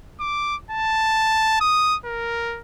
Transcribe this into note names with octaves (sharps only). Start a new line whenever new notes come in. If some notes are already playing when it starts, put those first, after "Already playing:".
D6
A5
D#6
A#4